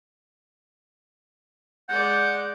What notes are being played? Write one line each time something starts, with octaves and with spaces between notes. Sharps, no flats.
G#3 D5 F#5 G6